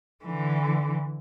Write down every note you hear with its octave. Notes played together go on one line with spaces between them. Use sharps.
D3 E3